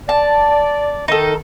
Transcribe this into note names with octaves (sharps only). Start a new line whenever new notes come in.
D5 A5
D#3 D#4 A4